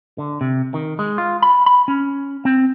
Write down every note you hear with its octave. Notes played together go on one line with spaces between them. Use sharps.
D3
C3
D#3
G#3
F4
B5
B5
C#4
C4